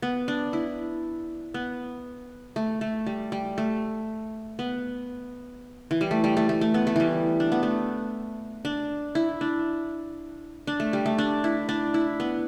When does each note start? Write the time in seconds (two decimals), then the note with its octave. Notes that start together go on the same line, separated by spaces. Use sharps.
0.02 B3
0.28 D4
0.53 E4
1.54 B3
2.56 A3
2.81 A3
3.06 G3
3.32 G3
3.58 A3
4.59 B3
5.91 E3
6.01 G3
6.11 A3
6.24 G3
6.37 A3
6.49 A3
6.61 A3
6.74 B3
6.87 A3
6.96 E3 G3
7.40 D4
7.52 B3
7.63 A3
8.65 D4
9.15 E4
9.41 D4
10.67 D4
10.80 A3
10.93 G3
11.06 A3
11.18 D4
11.44 E4
11.69 D4
11.94 E4
12.20 B3